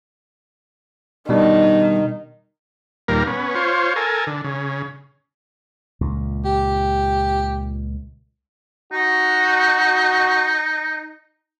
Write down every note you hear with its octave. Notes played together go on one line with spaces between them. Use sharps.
B2 D#3 G3 D4
D#2 A#2 G3 A#3 A#4
B3 C#4
F4 C5 C#5
A4 A#4 G#5
D3
C#3
C#2 A#2
G4
D#4 F#4